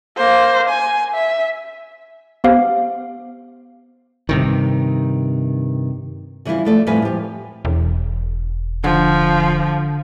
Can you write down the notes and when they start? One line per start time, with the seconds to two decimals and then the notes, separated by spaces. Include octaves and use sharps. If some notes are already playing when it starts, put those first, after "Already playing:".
0.17 A#3 C5
0.69 G#5
1.14 E5
2.44 B3 G4 C5 F5
4.29 G2 C3 D#3
6.45 C#3 E3 G3 E4 F4
6.65 F3 A3 D5
6.87 F2 A2 G3 F4 B4 G#5
7.02 F3 G4
7.65 E1
8.84 D3 F3